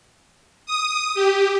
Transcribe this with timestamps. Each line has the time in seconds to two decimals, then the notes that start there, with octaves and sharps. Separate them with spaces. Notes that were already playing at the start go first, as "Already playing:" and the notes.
0.66 D#6
1.15 G4